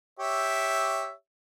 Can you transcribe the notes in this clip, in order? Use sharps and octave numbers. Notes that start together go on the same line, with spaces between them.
G4 C#5 E5